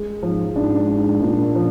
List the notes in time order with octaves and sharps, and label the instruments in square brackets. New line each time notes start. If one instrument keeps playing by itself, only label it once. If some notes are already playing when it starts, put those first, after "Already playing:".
Already playing: [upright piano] G#3
[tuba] G#2 [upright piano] F3
[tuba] G#2 [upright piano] D4
[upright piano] D4
[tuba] A#2 [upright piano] D4
[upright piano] F3